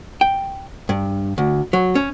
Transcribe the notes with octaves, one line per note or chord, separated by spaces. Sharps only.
G5
G2
D2
F#3
C#4